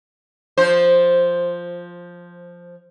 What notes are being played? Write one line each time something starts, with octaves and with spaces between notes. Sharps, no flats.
F3 C5